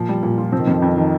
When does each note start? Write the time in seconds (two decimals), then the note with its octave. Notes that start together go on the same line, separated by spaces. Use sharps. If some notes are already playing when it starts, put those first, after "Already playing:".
Already playing: A#2 F3
0.09 G3
0.23 A#2
0.38 F4
0.52 F3 C4
0.59 D#3
0.67 F2 F3
0.82 F2
0.97 D#3